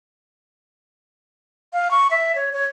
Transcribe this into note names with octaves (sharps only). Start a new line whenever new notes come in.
F5
C#6
E5
C#5
C#5